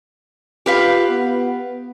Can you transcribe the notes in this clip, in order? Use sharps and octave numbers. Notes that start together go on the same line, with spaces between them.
F4 G4 B4 F5
B3